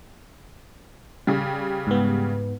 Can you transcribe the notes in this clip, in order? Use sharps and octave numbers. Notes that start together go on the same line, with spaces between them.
C#3 G3
G#2 B3